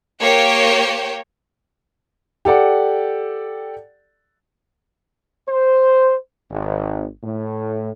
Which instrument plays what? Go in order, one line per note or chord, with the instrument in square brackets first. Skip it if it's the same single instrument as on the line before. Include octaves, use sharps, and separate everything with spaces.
[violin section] A#3 G4 C#5 G5
[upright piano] G4 A4 D5 F#5
[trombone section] C5
G#1
A2